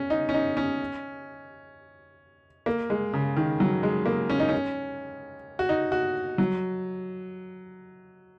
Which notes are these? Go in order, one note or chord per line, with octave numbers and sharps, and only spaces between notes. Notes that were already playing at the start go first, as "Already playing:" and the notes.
Already playing: C#4
D#4
C#4
D#4
C#4
A#3
G#3
C#3
D#3
F#3
G#3
A#3
C#4
D#4
C#4
F#4
D#4
F#4
F#3